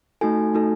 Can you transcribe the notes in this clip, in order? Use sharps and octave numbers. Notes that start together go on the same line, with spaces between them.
A3 D#4 F#4 A4 G#5
A3 D#4 F#4 A4